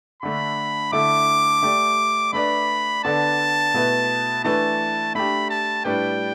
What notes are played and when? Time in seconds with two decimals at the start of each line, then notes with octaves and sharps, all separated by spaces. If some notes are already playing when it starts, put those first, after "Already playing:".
0.23 D3 A3 D4 B5
0.92 D3 A3 E4 A4 E5 D6
1.63 A3 G4 D5
2.33 A3 D4 B4 D5 B5
3.04 D3 B3 D4 A4 D5 A5
3.74 B2 A3 E4 B4
4.44 E3 A3 D4 B4 A5
5.15 A3 D4 G4 B5
5.50 A5
5.85 A2 G3 D4 B4 D5 G5